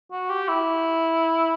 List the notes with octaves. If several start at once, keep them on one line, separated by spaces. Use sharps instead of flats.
F#4
G4
E4